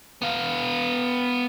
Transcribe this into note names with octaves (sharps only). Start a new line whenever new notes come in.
B3 F5